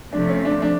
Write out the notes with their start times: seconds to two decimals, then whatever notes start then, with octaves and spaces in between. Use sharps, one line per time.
0.13 C3 F3 A3 D4
0.29 C#4
0.45 D4
0.62 D4